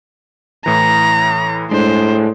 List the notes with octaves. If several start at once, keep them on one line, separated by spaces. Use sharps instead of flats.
A2 E3 A#5
A2 G#3 D4 C5